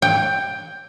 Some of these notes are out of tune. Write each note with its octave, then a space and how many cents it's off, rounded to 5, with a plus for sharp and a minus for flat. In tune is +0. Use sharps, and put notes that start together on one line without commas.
G5 +10